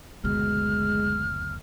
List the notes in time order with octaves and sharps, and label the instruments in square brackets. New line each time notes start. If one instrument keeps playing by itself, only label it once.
[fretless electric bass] F#1 D2 B2 [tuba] G#3 [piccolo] F6